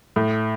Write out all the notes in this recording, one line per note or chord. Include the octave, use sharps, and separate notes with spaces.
A2